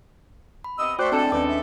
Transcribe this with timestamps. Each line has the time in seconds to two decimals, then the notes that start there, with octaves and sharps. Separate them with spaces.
0.64 B5
0.78 C3 B3 D#5 E6
0.99 A3 F#4 C5 D5 G5 D6 F#6
1.12 A2 G#3 C4 D4 A4 A5
1.32 D#2 C#4 D4 B4 D6
1.48 E5